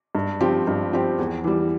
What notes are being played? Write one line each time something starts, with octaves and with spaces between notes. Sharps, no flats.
G2
F3 C4 G4
G2
F3 C4 G4
E2
E3 G3